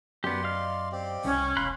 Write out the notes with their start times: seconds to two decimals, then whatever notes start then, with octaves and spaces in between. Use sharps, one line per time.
0.24 F#2 B3 G4 D5 C6
0.43 D#5 F5 F6
0.92 C4 G4 D5
1.24 C2 C#4
1.57 E1 C#5 F5 B5 C6 F#6